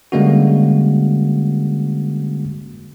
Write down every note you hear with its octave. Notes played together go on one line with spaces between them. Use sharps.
D3 G3 G#3 A#3 C#4 F#4